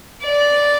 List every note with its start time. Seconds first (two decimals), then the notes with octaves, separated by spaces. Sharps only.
0.23 D5